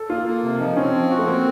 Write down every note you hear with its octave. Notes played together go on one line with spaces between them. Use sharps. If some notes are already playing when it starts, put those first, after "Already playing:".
Already playing: A4
A#3 F4
A#3
C3
F3 D#4
C4 C#4
F3
F#4
A3
A#3 C4